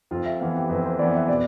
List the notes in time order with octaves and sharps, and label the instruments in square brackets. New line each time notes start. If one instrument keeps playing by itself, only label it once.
[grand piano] F2 [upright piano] F4
[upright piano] E5
[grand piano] E3 B3 [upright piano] F5
[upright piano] G4
[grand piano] F2 [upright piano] B4
[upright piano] C5
[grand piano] E3 B3 [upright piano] D5
[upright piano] E5
[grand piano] B2 [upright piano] D5